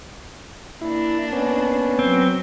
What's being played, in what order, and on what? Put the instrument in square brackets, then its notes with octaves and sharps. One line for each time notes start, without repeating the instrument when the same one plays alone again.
[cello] A#3 D4 [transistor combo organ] E4
[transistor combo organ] B3 C#4
[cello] F#3 [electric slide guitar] C4